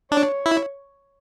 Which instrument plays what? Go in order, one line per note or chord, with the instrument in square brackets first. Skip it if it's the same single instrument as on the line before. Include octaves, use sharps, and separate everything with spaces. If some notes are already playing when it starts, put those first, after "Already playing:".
[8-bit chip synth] D4 [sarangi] C#5
[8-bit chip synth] E4